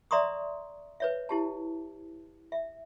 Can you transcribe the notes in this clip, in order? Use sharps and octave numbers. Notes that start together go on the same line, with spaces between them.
D5 E5 A#5 C6 C#6 D#6
B4 C#5 E5
E4 G4 A5
E5